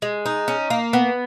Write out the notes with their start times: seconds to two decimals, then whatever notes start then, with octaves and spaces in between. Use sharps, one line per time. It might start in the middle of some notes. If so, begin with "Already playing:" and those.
0.02 G#3
0.26 D#4
0.48 C#4
0.70 A#3
0.93 B3